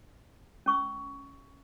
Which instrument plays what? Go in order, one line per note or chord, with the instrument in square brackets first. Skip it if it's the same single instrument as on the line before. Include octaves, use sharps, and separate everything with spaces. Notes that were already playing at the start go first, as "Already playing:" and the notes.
[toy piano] C#4 C#6 E6